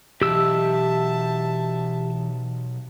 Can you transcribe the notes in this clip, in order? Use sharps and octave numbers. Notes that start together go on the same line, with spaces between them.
B1 E3 G4 E5 A5 E6